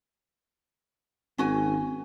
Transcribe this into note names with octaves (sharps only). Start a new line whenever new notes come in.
G#1 C#4 F#4 G#5